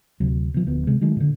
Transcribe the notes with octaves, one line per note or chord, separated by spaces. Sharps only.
D2 C3 F#3
B2 F3
D1 D2 F3 B3
C3 G#3
D#3 F#3 G#3 A3
A#2 D3